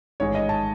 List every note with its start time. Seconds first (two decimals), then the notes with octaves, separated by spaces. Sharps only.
0.20 A1 G#2 D#3 G#3 C#5
0.35 D#5
0.49 A5